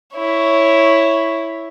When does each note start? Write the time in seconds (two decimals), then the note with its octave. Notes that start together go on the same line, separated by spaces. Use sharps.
0.15 E4 C#5